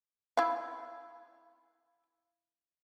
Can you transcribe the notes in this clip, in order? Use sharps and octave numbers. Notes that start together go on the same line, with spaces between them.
E4 F5